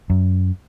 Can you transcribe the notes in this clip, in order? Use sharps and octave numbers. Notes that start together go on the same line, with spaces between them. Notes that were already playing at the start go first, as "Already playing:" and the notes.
F#2